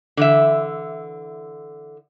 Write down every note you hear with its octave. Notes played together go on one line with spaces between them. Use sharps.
D3 E3 E5